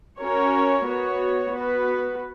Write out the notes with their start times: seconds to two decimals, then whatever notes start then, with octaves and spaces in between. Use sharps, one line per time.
0.19 C#4 F#4 A#4 C#5
0.86 B3 F#4 C#5
1.52 B3 F#4 B4